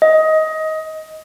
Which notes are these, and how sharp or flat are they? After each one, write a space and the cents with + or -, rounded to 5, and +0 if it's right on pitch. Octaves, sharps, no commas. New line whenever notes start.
D#5 +20